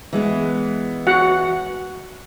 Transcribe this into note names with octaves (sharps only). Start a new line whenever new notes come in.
E3 G#3 B3
F#4 F#5